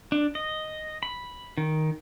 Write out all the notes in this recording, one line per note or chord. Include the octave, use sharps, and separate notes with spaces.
D4
D#5
B5
D#3